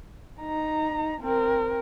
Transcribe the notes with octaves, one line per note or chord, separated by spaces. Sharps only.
D#4 A#5
C4 A#4